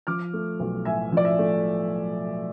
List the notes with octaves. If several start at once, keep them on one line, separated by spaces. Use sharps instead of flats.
F3 D6 F6
A3
B1
A2 E5 G#5
F3 D5
E5
A3